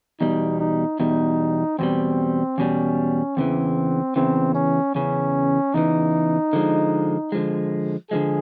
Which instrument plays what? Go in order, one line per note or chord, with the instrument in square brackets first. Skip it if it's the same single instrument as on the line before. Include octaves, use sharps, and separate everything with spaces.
[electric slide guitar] E2 B2 G3 [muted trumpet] D#4
[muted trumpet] D#4
[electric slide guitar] E2 B2 G3 [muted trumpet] D#4
[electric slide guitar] E2 B2 G3 [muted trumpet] C4
[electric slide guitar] E2 B2 G3 [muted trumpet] C#4
[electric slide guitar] E2 C#3 E3 [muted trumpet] C4
[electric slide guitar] E2 C#3 E3 [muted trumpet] C4
[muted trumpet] C#4
[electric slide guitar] E2 C#3 E3 [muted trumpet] C#4
[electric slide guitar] E2 C#3 E3 [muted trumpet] D#4
[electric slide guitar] D3 F3 G#3
D3 F3 G#3
[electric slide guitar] D3 F3 G#3 [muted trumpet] G#4